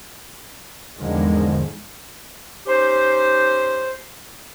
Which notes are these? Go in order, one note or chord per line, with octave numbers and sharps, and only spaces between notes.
E2 G#2 D3 D#3 F3 G#3
C#4 D#4 G4 C5